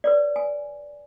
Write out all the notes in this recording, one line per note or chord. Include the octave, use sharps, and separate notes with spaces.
B4 C#5 D5
G#5